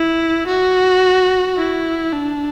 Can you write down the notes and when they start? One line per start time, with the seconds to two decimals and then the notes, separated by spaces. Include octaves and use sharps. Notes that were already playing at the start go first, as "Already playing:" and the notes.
Already playing: E4
0.47 F#4
1.57 E4
2.13 D4